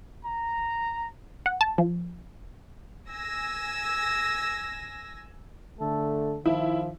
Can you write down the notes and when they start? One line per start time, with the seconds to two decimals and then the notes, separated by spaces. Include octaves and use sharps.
0.24 A#5
1.46 F#5
1.61 A5
1.78 F3
3.10 G#5 E6 A#6
5.80 D3 A3 A4
6.46 D#3 F3 E4 F4